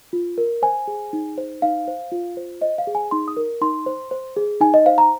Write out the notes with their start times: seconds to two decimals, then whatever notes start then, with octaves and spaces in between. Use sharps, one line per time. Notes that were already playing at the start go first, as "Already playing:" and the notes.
0.13 F4
0.38 A#4
0.62 C5 G#5
0.88 G#4
1.13 D#4
1.38 C5
1.62 D#4 F5
1.88 C5
2.12 F4
2.37 C5
2.61 C5 D#5
2.78 F5
2.87 G#4
2.95 G#5
3.11 D#4 C6
3.28 D#6
3.37 A#4
3.61 D#4 C6
3.86 C5
4.11 C5
4.37 G#4
4.61 D#4 G#5
4.74 D#5
4.86 C5 F5
4.98 A#5